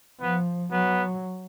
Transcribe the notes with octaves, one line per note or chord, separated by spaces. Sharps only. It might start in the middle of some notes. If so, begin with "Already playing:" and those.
F3 B3
F#3 B3